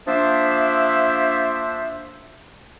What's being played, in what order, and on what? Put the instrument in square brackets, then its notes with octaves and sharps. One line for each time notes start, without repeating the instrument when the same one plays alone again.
[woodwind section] F3 A#3 D4 C5 E5